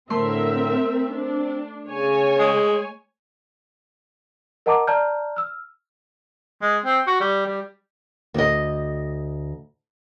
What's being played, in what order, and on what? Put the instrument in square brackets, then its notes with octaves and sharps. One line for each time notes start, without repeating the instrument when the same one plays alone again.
[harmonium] A2 D3 [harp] A3 C6 [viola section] C4 A#4 E5
[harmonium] C4 [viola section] D4
[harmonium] C#3 [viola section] C#5 G#5
[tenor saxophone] G#3
[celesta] A#4 D#5 F#5 A5 A#5 D6
D5 A5 A#5 F6 G6
E6 F6
[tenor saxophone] G#3
C4
F#4
G3
G3
[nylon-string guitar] D2 D#5